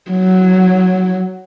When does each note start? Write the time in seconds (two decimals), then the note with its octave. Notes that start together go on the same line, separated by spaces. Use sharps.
0.11 F#3